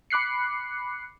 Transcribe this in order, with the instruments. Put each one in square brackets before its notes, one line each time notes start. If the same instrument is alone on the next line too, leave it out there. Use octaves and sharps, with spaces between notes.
[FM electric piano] B5 D6 F#6 C7 C#7